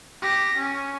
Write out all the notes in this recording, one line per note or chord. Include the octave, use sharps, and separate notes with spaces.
G4 A#6
C#4